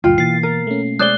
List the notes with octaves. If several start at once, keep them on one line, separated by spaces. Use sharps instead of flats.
D2 G2 A#2 F4 G5
B2 E3 A#3 A6 C7
A#4
A3 C#4
G#3 G#4 C5 D5 F#6 G7